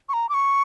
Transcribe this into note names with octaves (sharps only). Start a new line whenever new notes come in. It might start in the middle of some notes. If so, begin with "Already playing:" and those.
C#6
A#5
D6
C#6